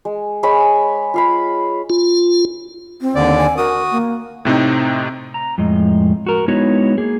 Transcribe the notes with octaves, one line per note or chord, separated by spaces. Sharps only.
G#3
G#3 C#5 G#5 B5
F4 F5 B5
F4
C4
D#2 D3 D5
G#5
F#4 A#4 D#6
A#3
A2 C3 C4 D#4
A#5
F2 A2 G#3 D#5
F#4 A#4
G#3 B3 D#4 E4 F#4 C#5
A#3 G#4